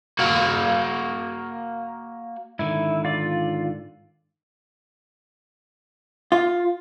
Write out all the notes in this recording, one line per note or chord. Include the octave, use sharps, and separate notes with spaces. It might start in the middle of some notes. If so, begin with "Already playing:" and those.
A#3 F#4
G#2 D3 D#3 E4
F4 D5
F4